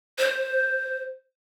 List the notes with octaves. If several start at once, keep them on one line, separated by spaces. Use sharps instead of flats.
C5